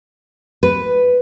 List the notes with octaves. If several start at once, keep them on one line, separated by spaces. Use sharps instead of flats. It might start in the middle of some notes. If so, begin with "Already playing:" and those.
B4